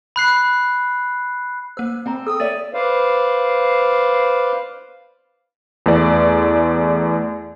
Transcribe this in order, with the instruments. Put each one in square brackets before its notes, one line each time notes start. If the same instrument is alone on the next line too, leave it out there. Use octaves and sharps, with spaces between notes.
[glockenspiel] B5 F#6 C7
[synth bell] A#3 E6 [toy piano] C5
[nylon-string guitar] C4 [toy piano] G5 G#5 A#5
[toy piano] A4 [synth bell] G5 D#6 E6
[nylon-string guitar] C#5 D5 E5 [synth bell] A6 D#7
[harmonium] B4 C5 D5 F5
[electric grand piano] E2 A3 D5